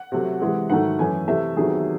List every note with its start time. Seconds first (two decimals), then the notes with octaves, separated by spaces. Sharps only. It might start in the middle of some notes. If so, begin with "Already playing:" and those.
Already playing: F#5
0.12 C3 F#3 A3
0.42 C3 E3 G#3
0.70 G#2 D#3 F#3 A3 F#5
0.99 F#2 E3 A3 G#5
1.28 C3 E3 A3 E5
1.57 E2 C3 D#3 F#3 A3 G#4